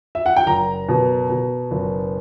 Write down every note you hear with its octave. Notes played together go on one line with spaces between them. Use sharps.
E5
F#5
G5
F#1 A#5
B2
B2
F#1